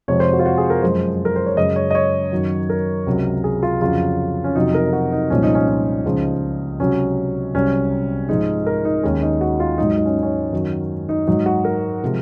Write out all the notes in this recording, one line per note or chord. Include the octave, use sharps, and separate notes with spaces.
F2 C3 F3 G#3 C#5
C5
F#4
F4
F#4
G#4
A#4
F#2 F3 G#3 C5
A#4
C5
C#5
F#2 C#3 G#3 D#5
C#5
D#5
C#5
F#2 D#3 F#3
A#4
C#2 C3 F#3
G#4
F4
F2 C#3 F#3 F4
C#4
F2 C3 F#3 D#4
A#4
F#4
D#4
C2 A#2 F3 G#3 C#4
D#4
C#4
D#4
C#2 C#3 F3 G#3
C#2 C3 F#3 C#4
C2 C3 F#3 C#4
G#2 F3 G#3 D#4
A#4
D#4
D#2 D#3 G#3 C#4
D#4
F#4
F4
G#2 F#3 D#4
D#4
C#4
C#4
F#2 D#3 F#3
D#4
G#2 F#3 D#4
F#4
A#4
C3 F3 G#3